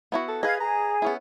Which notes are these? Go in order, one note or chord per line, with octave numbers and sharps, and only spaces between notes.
B3 E4 F#4
A4
G#4 B4 D#5 F5 G#6
G#4 A#5
B3 C#4 E4